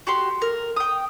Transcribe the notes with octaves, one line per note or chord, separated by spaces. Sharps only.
F#4 G4 C6
A#4
G5 D#6